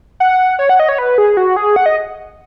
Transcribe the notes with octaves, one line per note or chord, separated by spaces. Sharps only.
F#5
C#5
F#5
D#5
C#5
B4
G#4
F#4
G#4
F#5
D#5